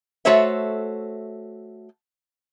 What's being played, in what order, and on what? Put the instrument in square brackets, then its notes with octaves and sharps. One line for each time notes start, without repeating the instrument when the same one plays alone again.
[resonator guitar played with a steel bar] A3 F#4 A4 C5 C#5 E5